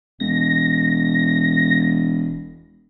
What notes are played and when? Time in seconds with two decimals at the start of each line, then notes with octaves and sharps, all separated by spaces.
0.20 E1 A#6